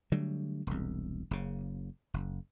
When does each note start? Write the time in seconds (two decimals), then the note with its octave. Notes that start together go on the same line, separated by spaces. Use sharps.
0.12 D3 F#3 G3 A3
0.67 E1 C2
1.31 F#1 C#3
2.14 F#1